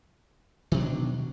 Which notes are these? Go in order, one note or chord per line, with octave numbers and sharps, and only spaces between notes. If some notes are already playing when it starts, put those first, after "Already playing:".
B2 D#3 F#3 D4